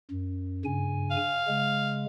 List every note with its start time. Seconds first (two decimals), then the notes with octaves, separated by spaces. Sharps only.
0.11 F#2
0.65 G2 C#3 G#5
1.11 F5
1.48 C#3 G#3